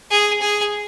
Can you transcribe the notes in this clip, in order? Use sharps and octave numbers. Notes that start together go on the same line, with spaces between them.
G#4
G#4